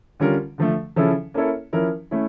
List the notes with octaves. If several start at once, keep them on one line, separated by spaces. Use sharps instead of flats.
D3 G3 C#4 F4 A#4
D3 F3 A3
C#3 F3 C#4 E4 A4
A#3 C#4 E4 A4 C#5
F3 C#4 E4 A#4
A3 C#4 E4